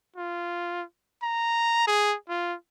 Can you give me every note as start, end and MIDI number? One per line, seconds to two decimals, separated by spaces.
0.16 0.83 65
1.23 1.87 82
1.87 2.15 68
2.29 2.55 65